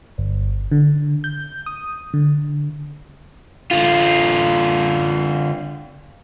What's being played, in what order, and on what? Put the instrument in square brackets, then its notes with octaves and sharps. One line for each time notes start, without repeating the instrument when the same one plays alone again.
[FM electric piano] G1
D3
G6
D#6
D3
[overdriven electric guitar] D3 F4